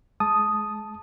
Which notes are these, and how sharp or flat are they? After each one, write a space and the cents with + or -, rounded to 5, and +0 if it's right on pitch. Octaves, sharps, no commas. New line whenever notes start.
G#3 +25 A5 -10 D#6 +0